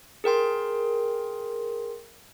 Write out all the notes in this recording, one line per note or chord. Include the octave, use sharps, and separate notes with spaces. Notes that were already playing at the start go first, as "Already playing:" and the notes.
G#4 A#4 G5 C6